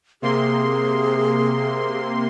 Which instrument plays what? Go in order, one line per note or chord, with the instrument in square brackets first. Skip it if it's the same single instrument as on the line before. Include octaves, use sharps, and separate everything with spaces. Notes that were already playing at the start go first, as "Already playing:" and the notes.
[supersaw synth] C3 A#3 C6 [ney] G#4